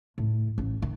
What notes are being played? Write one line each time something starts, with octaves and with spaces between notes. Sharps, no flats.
A2
A1
D#3